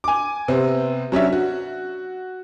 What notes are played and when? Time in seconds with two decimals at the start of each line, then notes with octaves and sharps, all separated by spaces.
0.04 G#5 D6
0.48 C3 B3 C4
1.12 F#3 C#4 D4 E5
1.33 F#4